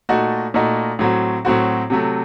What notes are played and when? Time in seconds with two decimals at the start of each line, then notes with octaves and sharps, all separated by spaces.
0.09 A#2 A3 D#4 F#4
0.54 A#2 A3 D#4 F#4
0.99 A2 F#3 C4 F#4
1.45 A2 F#3 C4 F#4
1.90 C3 F#3 A3